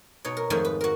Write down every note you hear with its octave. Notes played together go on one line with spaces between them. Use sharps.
B2 D#4 C#5
A#4
F2 G#2 D#3 F3 A3 G#5
B4
F#4 A#4